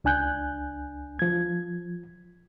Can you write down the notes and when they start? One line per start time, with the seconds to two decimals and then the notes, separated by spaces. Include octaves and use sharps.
0.04 C#2 D4 G#5 F#6 G6
1.19 F3 G#6